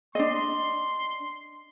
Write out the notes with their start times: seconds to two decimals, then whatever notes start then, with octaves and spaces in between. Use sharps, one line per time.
0.15 D4 D#5 C6